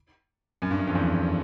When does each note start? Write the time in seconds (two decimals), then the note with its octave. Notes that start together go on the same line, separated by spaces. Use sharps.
0.62 F#2
0.71 G2
0.79 F#2
0.87 F2
0.95 E2